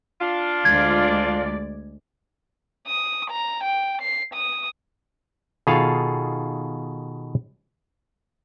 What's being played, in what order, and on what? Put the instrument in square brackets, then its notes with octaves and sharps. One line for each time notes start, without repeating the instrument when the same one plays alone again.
[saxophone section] D4 F4
[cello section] D2 G#3 D5 [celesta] G#6
[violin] D#6
A#5
G5
C7
D#6
[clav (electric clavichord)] B2 D#3 F4 G#4 A4 F5